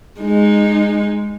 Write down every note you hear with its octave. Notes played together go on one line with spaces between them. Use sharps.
G#3 D#4